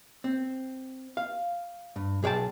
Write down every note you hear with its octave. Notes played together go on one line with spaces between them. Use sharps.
C4
F5
G2
B1 G#4 C#5 G5 A5